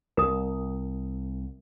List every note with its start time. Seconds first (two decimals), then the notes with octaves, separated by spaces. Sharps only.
0.17 C2 A#4 D#6